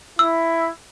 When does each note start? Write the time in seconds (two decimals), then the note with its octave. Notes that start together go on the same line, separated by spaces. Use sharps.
0.19 E4 E6